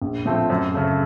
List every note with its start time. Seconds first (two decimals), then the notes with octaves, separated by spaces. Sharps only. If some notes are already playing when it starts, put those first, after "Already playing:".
0.02 A#1
0.25 A2 F3 A3 C4
0.50 F#2
0.74 C#3 A3